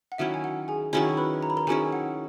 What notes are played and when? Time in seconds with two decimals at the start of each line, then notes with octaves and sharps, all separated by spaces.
0.12 F#5
0.18 D#3 F#3 C#4 E4 E5
0.34 G#5
0.44 F#5
0.68 G#4 G#5
0.93 D#3 F#3 C#4 E4 G#4 G#5
1.17 B4 B5
1.43 A#5
1.50 B5
1.57 A#4 A#5
1.67 D#3 F#3 C#4 E4 G#4 G#5
1.92 F#5